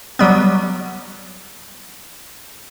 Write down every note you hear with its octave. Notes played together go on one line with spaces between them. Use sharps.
F#3 G3 B3